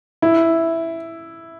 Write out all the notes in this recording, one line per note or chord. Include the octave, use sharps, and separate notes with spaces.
E4